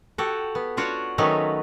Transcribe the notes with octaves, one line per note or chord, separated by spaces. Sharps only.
F#4 G4 A4
B3
D4 F4 F#4 C#5 D5
D#3 F#3 A3 B3 C#4 D#4